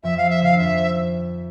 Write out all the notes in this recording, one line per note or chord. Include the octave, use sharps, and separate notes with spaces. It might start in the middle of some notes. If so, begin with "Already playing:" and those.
F2 F3 E5
F5
E5
D3 F5
D#3
F2 F3 E5